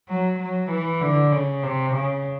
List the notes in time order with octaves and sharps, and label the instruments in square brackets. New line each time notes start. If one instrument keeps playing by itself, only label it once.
[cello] F#3
F#3
E3
D3
C#3
C3
C#3